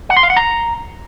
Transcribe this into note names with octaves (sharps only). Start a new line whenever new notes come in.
F#5
C6
F5
F#5
A#5